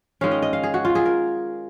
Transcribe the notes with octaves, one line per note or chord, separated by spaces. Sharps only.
D#3 G#3 C#4 F5
D#5
D#5
F5
G#4
F#4
F4
G#4
A#4